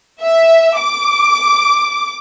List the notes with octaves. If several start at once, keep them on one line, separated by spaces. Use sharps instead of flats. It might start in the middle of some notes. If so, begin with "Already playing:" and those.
E5
D6